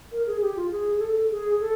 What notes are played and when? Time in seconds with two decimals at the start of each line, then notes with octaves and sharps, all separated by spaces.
0.12 A#4
0.27 G#4
0.42 G4
0.56 F4
0.71 G#4
0.96 G#4
1.01 A4
1.31 G#4
1.60 A4